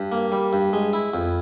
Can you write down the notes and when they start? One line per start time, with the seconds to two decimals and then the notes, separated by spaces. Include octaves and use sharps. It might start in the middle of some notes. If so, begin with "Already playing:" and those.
Already playing: G2
0.12 A#3
0.32 G3
0.53 G2
0.73 G#3
0.93 E4
1.14 F2